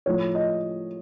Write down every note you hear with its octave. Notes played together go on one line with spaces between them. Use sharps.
A2 F3 C#5
D#5